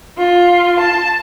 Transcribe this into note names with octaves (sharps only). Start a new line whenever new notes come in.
F4
A5